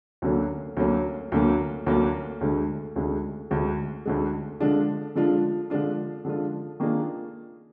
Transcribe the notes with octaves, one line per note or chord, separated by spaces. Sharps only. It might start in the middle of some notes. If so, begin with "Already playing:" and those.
D2 D3 F#3 A#3
D2 D3 F#3 A#3
D2 D3 F#3 A#3
D2 D3 F#3 A#3
D2 D3 G#3
D2 D3 G#3
D2 D3 G#3
D2 D3 G#3
D3 F3 G#3 D4 F4
D3 F3 G#3 D4 F4
D3 F3 G#3 D4 F4
D3 F3 G#3 D4 F4
D#3 A#3 D4 F4 G#4